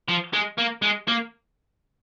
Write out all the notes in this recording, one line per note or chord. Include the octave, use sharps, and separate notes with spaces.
F3
G#3
A#3
G#3
A#3